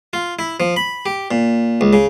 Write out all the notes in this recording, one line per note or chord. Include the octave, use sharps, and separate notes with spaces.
F4
E4
F3
B5
G4
A#2
C#2
C#3